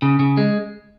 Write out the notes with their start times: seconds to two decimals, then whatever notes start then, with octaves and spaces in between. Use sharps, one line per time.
0.02 C#3
0.20 C#3
0.37 G#3